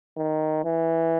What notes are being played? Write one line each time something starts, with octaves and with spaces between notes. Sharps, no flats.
D#3
E3